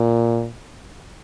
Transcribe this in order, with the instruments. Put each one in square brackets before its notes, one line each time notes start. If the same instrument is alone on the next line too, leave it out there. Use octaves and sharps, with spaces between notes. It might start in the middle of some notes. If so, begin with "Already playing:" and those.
Already playing: [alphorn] A#2